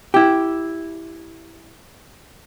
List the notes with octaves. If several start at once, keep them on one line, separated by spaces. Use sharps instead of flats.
E4 G4